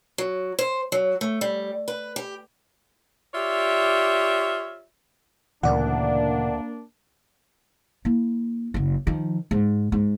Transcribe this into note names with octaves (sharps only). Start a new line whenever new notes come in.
F#3
C5
F#3
A3
G3
B4
G4
F4 G4 C#5 D5 E5
D2 A#2 C#3 E3 A#3 D4 D5 F#5
A#3 E4
F#1 F#3
D#3 F3
G#2
G#2